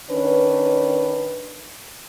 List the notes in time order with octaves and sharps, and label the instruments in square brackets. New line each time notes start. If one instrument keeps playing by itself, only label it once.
[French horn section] D#3 C#4 D4 B4